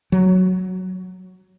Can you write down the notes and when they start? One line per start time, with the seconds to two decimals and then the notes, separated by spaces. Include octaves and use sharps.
0.12 F#3